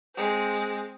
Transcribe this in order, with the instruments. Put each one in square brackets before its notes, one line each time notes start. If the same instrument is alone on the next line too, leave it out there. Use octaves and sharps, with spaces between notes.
[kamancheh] G#3 C4